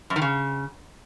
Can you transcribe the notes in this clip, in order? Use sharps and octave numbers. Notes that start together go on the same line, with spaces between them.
F#2
D#3
C#3